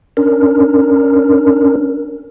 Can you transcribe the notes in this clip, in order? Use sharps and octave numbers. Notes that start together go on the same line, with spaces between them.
C#4 D4 A#4